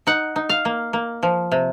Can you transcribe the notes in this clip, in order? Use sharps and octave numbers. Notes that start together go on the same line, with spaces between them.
D#4 F#5
D#4
F5
A#3
A#3
F3
C3